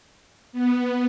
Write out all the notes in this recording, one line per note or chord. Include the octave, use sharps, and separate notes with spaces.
B3